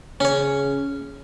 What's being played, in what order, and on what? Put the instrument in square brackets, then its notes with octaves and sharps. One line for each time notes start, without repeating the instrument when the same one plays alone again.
[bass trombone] C#3 [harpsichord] C#4 C#5